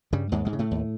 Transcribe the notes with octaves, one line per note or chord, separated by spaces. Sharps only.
G2 C#3 G3
D#2 G#2 G#3
G#2 G#3
C#3
A2 A3
D#2